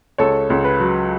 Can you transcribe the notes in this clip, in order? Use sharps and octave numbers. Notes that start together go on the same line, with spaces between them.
C#2 A4 C#5
C#2
B4
F#3